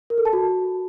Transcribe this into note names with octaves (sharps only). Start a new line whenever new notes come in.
A#4
A4
A5
F#4